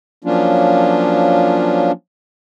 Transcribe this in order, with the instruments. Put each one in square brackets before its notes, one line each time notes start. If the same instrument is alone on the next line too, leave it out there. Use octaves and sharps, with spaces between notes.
[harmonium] F3 F#3 A#3 C#4 D4 F4